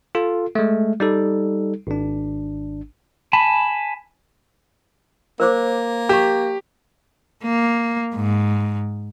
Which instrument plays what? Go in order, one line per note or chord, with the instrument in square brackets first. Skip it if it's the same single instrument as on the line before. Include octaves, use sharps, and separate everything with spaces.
[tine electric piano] F4 A4
G#3 A3
G3 D#4 A4
G#1 D4
[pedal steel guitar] G#5 A5 B5
[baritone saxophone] A#3 [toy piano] A#4 C5 D6
[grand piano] G4 [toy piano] A#5 C#6
[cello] A#3
G#2